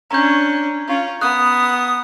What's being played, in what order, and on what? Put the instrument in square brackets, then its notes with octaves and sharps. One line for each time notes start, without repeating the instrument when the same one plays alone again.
[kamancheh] C#4 D4 [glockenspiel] A#5 G6
[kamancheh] C#4 F4
[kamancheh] B3 [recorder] D#6 [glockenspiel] F#6